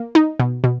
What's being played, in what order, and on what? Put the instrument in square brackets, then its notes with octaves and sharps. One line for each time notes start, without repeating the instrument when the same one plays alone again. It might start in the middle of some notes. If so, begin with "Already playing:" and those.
Already playing: [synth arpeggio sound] A#3
D#4
B2
B2